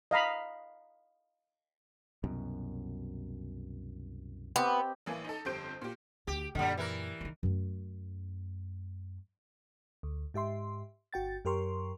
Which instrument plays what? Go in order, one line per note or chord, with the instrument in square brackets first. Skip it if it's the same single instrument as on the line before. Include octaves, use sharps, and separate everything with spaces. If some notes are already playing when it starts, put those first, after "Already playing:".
[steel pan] D#5 F5 A#5 B5
[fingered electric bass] C2 F#2 B2
[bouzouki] B3 [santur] C4 G4 D#5
[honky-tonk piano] A1 E3 A#3 G#5
D#4 A4
G1 F2 G4 C5 G6 D7
A#2 G4
[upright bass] D2 [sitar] G4
[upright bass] F#2 A#2 [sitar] D3 G3
[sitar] E3 A#4
[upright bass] D#3 F3
F#2 A3
[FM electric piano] D2
G#2 G4 E5 C6
G1 F#4 G5 A6
F#2 G4 A#4 C6 C#6